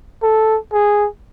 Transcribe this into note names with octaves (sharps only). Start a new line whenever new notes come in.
A4
G#4